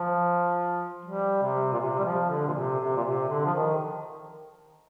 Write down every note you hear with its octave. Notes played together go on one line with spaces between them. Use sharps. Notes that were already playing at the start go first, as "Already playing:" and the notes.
Already playing: F3
G3
C3
A#2
C3
G3
F3
D3
A#2
C3
C3
A#2
C3
D3
F3
D#3